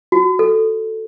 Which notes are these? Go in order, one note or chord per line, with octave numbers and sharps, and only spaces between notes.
F#4
A4